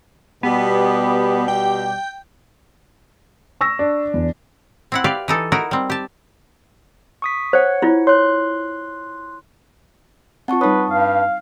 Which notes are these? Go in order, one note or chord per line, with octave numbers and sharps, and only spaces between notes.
B2 G3 B3 G4
G5
C#6 E6 A#6
D4
E2
C4 E4 F#5
G4 B4 D5 F5
E3 D#4 A4
D#4 E4 F#4 A#4
G3 C4
G4 A5
C#6 D#6 B6
C5 C#5 F#5
E4 F4
C#5 C6 F#6
C4 F4 F#5 A5 C#6
G3 D#4 B4 C#5 A5 D#6
G2 F5